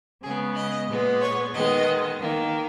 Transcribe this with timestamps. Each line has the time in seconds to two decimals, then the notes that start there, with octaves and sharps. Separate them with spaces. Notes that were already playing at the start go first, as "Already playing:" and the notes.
0.23 C#3 G#3 B3 G#4
0.55 D#5
0.89 A#2 G#3 B3
1.21 C#5
1.53 D#3 G#3 B3 D#5
2.20 D#3 A#3